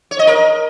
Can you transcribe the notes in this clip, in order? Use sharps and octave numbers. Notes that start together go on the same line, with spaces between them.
C#5
D#5
A#4